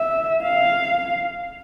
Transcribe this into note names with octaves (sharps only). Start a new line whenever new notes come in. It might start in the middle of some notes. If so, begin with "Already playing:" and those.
Already playing: E5
F5